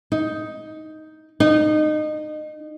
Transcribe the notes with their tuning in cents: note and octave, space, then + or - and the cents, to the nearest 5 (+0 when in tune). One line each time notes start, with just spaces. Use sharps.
D#4 +5
D#4 -25